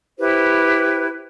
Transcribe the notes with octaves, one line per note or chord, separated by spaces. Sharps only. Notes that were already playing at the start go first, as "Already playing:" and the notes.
E4 G4 B4 C5